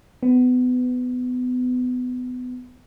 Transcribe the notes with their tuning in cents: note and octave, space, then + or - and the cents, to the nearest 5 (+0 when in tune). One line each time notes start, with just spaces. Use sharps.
B3 +25